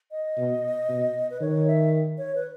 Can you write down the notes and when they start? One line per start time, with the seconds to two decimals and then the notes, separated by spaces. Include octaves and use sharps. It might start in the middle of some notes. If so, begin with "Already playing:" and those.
0.11 D#5
0.37 B2
0.89 B2
1.30 B4
1.41 D#3 C#5
1.67 E5
2.18 C#5
2.35 B4